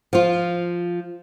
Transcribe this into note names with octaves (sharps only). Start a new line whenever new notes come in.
F3 F4